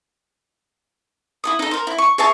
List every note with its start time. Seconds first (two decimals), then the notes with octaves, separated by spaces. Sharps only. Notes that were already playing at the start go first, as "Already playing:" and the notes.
1.44 E4 A4 D#6
1.59 D#4 A4
1.71 A#4 C5
1.87 E4
1.98 C#6
2.18 G#4 C#5 E5 A5